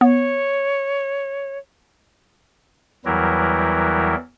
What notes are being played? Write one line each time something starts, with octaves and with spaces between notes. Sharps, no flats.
B3 C#5
E2 E3 F#3 G3 E4 A#4